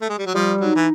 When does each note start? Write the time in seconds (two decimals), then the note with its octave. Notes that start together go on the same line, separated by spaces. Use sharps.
0.02 A3
0.09 G#3
0.18 G3
0.26 F#3
0.34 F3 G3
0.60 F#3 D#4
0.76 E3